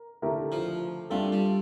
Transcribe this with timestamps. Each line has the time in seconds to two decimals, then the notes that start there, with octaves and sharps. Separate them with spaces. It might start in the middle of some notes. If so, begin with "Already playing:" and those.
Already playing: A#4
0.22 D3 A3 E4 G4 A#4
0.52 F3
1.10 G3 A3 D4 F4 A4
1.32 G3